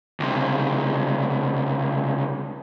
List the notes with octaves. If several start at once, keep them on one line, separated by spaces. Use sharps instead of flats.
C#2 C3